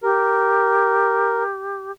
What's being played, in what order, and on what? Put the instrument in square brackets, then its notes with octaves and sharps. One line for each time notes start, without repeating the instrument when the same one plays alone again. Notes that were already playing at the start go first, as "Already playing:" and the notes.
[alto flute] G4 [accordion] A#4